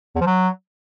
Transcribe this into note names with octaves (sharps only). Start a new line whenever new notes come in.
E2
F3
F#3